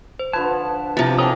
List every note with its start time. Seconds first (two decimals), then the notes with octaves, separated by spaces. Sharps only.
0.19 C5
0.33 D3 F3 B4 A5 G#6
0.97 C3 F3 E4 G4 E5 F5 A#5
1.18 G#4 A4 C#5 D#5 G5 A#5 D6 D#6